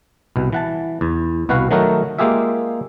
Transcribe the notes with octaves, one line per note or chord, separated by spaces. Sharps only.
C2 B2
E3 F#5 A5
E2
C2 B2 F#4 B4 F5 F#5
D#3 F#3 A3 D#4 F#4 A#4
G#3 A#3 F4 G4 G#4 E5